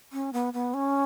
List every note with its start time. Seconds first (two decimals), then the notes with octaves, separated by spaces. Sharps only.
0.13 C#4
0.33 B3
0.53 B3
0.74 C#4